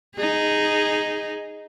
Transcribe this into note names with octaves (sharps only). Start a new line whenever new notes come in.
D#4 G#4